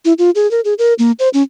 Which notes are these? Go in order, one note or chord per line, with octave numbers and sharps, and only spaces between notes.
E4
F4
G#4
A#4
G#4
A#4
A#3
C5
C#4